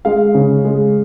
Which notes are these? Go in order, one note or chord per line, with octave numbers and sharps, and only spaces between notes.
G#3 F5
C#3
G#3